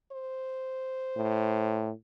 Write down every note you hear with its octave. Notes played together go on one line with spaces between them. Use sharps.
C5
A2